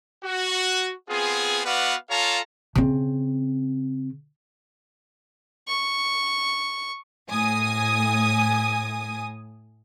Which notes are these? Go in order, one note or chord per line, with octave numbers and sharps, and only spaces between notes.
F#4
B3 C4 F4 G#4
B3 F#4 B4 D5 F5 F#5
F4 A4 C#5 F5 A5 A#5
C#3 C4
C#6
A2 G#5 D#6